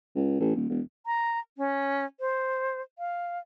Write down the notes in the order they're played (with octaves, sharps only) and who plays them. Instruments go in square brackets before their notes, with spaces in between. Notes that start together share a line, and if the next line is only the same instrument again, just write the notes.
[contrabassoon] C#2
A1
D#1
E1
[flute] A#5
C#4
C5
F5